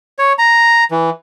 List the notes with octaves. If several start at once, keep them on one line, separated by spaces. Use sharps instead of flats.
C#5
A#5
E3